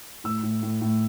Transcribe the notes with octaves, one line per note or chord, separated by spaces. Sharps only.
A2 E6
A2
A2
A2